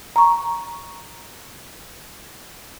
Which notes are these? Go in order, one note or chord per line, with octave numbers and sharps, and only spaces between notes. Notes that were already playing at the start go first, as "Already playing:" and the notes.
A#5 C#6